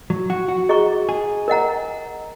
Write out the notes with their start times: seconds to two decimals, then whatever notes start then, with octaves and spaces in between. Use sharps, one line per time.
0.10 F#3
0.30 F#4
0.48 F#4
0.69 G#4 D#5 A#5 C#6
1.09 G#4
1.48 A#4 D#5 F#5 A#5